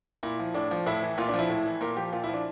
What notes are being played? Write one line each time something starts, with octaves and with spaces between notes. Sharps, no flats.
A#2 E4
F3
A2 D4
F3
A2 E4
E3
A#2 F4
D4
F3
E4
A2
E3
A#2 A#4
F3 G4
A#2 F4
E4
F3
D4